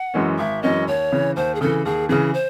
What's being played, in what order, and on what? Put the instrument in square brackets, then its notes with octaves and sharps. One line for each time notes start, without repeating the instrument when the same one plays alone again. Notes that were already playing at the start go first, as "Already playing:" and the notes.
Already playing: [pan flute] F#5
[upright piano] F#2 E3 G#3 C#4
[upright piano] G#1 [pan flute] E5
[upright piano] F#2 E3 G#3 C#4 [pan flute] D#5
[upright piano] D#2 [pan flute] C#5
[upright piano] C#3 E3
[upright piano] D#2 [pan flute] C5
[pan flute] G#4
[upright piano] C#3 E3 [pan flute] A4
[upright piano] D#2 [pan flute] G#4
[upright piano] C#3 E3 [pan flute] G#4
[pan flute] C5